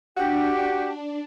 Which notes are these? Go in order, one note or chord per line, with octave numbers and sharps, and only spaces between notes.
D4 F#4 G4